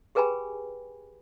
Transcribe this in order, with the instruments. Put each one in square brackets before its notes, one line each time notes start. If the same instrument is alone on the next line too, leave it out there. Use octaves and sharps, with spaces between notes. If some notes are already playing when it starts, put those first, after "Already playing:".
[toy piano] G4 G#4 B4 G5 G#5 B5